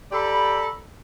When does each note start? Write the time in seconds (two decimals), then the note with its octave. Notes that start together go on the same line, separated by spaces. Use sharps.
0.12 G4 A4 D5 A#5 B5